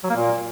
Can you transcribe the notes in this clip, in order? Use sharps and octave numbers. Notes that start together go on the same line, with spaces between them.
F#3
A#3
A#2